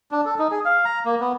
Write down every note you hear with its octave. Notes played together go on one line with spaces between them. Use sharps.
D4
A4
D#4
G#4
F5
A#5
A#3
B3